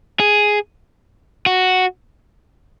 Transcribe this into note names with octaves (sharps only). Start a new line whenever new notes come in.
G#4
F#4